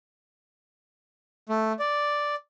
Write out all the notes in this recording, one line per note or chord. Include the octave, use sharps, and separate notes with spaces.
A3
D5